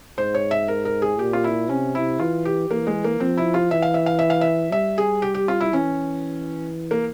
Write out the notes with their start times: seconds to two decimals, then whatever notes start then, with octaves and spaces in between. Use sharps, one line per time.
0.18 G#2 C5
0.35 C#5
0.51 E5
0.68 A#4
0.85 A#4
1.02 G#4
1.19 A#2 G4
1.33 F4
1.44 E4
1.69 C3 C#4
1.95 E4
2.20 E3 F4
2.45 G4
2.70 E3 A#3
2.87 G#3
3.04 A#3
3.20 F3 C4
3.37 E4
3.54 F4
3.71 E3 E5
3.82 F5
3.94 E5
4.06 F5
4.19 E5
4.30 F5
4.41 E5
4.72 G3 E5
4.98 G#4
5.22 G4
5.34 G4
5.48 F4
5.60 E4
5.73 E3 C#4
6.91 A#3